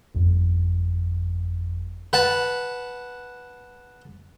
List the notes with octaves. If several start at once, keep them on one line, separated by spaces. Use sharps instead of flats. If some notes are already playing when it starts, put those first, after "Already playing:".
G1 F2
B4 F#5 A5